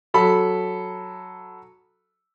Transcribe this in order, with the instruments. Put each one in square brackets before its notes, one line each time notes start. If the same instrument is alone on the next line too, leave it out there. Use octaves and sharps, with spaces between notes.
[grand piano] F#3 A4 B5